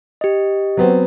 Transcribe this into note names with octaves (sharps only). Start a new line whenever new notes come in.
G4 D#5
F#3 B3 C4